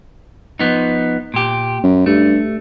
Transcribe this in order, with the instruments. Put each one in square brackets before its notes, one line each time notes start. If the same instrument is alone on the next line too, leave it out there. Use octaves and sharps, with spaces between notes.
[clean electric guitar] F3 B3 D#4
A#2 G4
[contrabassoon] F#2
[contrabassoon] G2 [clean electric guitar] A3